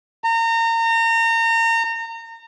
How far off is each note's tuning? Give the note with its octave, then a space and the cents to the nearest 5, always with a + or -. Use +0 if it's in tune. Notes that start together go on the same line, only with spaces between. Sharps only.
A#5 -30